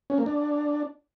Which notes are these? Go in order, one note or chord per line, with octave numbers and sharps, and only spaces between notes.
C#4
A#3
D4